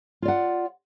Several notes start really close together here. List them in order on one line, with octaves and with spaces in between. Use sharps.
F4 D5 F#5